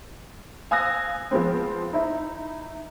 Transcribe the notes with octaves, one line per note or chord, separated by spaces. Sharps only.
F5 G#5 D#6 E6 F#6 A#6
F3 G#3 B3 C4
D#4 E4